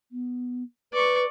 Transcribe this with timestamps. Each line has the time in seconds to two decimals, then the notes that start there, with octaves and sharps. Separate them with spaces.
0.12 B3
0.93 B4 D5 C#6